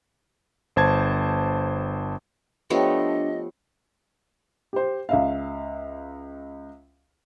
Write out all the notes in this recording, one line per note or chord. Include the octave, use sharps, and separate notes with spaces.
G1 C5 A5 G#6
F3 A3 B3 D4 G4 C#5 D#5 G5
G4 C5
C#2 E5 F5